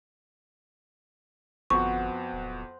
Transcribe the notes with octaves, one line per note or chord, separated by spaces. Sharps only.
G1 F2 B3 F#4 C5 F#5 C#6
D1